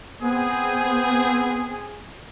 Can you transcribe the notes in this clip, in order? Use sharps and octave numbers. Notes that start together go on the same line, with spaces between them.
B3 C4 G#4